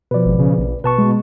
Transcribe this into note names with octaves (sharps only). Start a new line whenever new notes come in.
B2 F3 B4 D5
G#1
C#3
A#1
B2 B4 A5 C#6
G#3